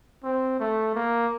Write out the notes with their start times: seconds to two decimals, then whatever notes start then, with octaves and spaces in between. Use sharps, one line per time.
0.24 C4
0.60 A3
0.95 A#3